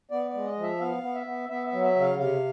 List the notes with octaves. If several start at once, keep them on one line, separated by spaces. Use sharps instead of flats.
B3 D5
D5
G#3
D#5
F3 E5
B3 F5
B3
E5
B3
B3 E5
E5
F#3
E5
C#3
F5
C3 F5